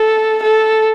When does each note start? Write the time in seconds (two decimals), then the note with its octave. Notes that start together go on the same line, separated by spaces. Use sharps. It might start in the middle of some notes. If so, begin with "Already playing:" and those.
Already playing: A4
0.42 A4